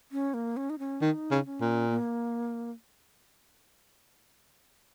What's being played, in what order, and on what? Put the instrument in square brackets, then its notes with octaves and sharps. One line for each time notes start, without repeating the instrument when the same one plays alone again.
[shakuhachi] C#4
A#3
C#4
D#4
C#4
[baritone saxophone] D#3 [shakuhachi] D#4
[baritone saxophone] C#3
[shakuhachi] C#4
[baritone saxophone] A#2
[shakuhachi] A#3